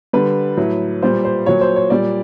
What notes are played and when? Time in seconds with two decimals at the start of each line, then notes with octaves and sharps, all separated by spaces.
0.13 D3 G3 B4
0.57 A2 F#3
1.02 A#2 G3 C5
1.25 C5
1.46 A#2 F#3 C#5
1.61 C5
1.76 C#5
1.90 A#2 G3 D5